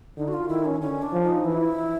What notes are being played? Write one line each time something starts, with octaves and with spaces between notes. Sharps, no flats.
D3 D#4
F#4
F4
D#3 E4
C#4
D3 C#4
D4
F3
D#4
E3 E4